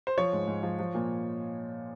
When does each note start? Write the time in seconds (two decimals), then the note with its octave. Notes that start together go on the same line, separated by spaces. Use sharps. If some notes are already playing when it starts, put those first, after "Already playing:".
0.07 C5
0.18 F3 C#5
0.33 G#2
0.47 G#2
0.63 F3
0.79 F3
0.94 A#2